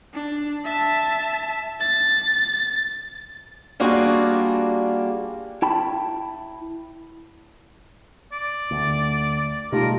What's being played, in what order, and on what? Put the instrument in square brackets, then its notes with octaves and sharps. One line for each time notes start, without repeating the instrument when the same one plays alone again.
[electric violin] D4
E5 A5
A6
[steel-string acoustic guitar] G3 A#3 D4 F4 F#4 G#4
[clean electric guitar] E4 G5 A5 B5
[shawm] D5
[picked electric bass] D2
[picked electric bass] B2 A3 [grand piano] G3 D#4 F4 [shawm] A#4